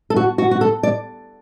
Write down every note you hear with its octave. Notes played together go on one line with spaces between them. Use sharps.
A4
F#4
F#4
F#4
A4
D5